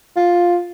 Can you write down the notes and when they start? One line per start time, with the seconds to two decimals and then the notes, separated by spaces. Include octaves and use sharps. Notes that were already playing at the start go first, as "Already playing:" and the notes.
0.16 F4